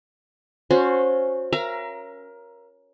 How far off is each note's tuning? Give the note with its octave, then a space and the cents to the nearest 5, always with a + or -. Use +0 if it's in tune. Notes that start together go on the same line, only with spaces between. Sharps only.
C#4 +0 F#4 -25 C5 +0
A#4 +15 E5 +45 A#5 +0